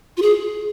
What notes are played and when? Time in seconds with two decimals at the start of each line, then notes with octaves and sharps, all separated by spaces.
0.17 F4
0.22 G#4